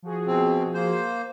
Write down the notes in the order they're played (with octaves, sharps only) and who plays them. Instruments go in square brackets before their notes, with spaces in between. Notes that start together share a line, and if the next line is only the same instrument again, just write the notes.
[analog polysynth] F3 F#4 G#4
[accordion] B2 C4
A#3 C5